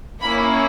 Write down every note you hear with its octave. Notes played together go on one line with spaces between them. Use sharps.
A#3 C#4 E4 B5